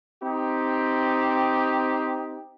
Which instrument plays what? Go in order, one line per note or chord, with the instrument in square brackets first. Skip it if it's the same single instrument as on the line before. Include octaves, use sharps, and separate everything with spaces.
[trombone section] C4 D#4 G4